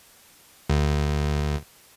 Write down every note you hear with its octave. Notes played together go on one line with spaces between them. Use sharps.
D2